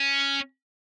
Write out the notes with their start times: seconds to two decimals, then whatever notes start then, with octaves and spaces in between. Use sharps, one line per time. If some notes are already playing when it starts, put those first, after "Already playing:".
Already playing: C#4